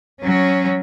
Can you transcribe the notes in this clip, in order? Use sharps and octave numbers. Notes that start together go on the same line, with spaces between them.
F#3 C#4